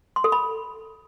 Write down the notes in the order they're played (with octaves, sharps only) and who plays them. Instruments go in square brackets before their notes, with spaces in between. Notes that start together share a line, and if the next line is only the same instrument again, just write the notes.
[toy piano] C6
A4
B5